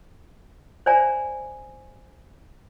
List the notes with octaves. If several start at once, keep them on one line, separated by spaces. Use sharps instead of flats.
C5 D5 E5 G#5 A#5